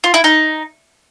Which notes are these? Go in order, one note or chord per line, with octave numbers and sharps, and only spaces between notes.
F4
E4
D#4